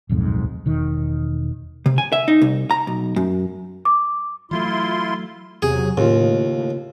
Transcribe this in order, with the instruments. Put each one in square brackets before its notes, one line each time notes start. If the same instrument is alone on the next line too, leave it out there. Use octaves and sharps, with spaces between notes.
[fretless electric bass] D1 B1 F2 G#2
E1 D#3
[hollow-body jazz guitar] C3
G#5
E5
D#4
C2
A#5
B1
F#2
[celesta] D6
[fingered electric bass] E3 F#3 A3 [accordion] E4 F4 C6
[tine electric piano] E2 C3 [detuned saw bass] F#3 [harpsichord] G#4
[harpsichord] D#2 [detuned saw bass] A2 [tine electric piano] C#3 F4